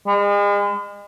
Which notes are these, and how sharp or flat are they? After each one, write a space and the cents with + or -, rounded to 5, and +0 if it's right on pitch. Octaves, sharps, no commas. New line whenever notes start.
G#3 -40